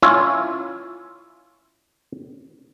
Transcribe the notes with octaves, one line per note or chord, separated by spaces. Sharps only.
C#4 E4 F4